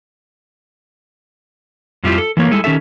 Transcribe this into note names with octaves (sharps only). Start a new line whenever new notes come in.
F2 F3 G3 E4 F4 G4
A4
E3 A3 A#3 C#5
G3 G#3 E4 A4
D#3 C#4 G4 A4 E5